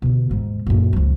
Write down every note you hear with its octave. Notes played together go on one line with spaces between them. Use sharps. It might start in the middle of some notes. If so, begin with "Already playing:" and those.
B2 D3
D#2 G#2
F#2 A#2
C#2 F3